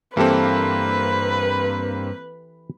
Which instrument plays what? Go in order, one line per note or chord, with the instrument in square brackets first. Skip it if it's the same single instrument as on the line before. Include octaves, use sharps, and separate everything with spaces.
[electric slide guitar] G2 [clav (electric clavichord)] E3 G4 A4 [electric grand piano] A#3 C4 [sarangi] B4